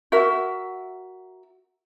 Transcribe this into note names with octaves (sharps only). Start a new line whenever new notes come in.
F#4 A#4 E5